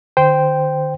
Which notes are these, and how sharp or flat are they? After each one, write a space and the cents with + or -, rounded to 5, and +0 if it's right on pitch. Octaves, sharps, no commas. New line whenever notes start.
D3 +45 C5 -10 G5 +0